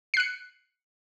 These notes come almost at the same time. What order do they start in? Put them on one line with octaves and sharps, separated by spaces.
C7 F#6 C#7